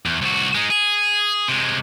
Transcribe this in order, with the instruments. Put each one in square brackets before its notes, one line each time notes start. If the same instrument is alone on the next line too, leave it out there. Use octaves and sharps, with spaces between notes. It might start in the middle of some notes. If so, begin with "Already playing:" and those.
[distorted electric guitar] E2
C2 F#4
G#3 D#4
G#4
C3 G#3